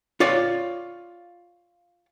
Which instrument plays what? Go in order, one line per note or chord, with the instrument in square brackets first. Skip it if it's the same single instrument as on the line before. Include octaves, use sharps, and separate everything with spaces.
[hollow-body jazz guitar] F4 C#5 D5